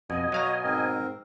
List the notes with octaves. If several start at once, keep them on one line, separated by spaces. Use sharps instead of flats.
F2 B2 D#5 G#5
F#3 F#4 F5 A#5
G#2 C4 A#4